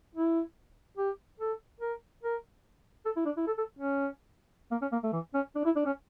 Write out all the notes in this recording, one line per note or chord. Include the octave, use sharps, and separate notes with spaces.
E4
G4
A4
A#4
A#4
A4
E4
D4
E4
A4
A4
C#4
A#3
C#4
A#3
A3
E3
C#4
D4
E4
D4
C#4